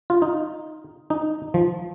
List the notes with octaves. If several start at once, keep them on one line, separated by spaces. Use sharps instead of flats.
F4
D#4
D#4
F3